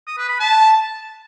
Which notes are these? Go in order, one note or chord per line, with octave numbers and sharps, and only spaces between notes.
D#6
B4
B5
A5